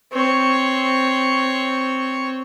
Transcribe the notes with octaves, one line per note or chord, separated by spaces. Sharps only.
C4 C#5